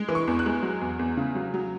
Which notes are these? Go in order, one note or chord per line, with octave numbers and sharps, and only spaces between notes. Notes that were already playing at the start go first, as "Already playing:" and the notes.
Already playing: G#3
E3
C#6
E2
F#6
G#3
F#3
E2
E2
C#3
F#3
F#3